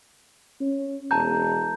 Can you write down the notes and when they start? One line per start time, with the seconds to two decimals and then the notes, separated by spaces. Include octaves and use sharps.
0.61 C#4
1.11 E1 A5 A#5 G6